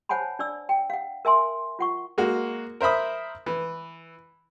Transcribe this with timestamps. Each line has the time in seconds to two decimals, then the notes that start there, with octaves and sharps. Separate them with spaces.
0.09 C5 C#5 F#5 G#5 A5 B5
0.39 D4 D5 E6
0.69 G5
0.90 F5 F#5
1.25 A#4 E5 G#5 C6
1.79 F4 F#5 C#6
2.18 G#3 A#3 F#4
2.81 A#4 C5 E5 B5 D#6
3.46 E3